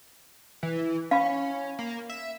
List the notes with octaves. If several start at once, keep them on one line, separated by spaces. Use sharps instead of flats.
E3
C#4 F5 B5
A#3
E5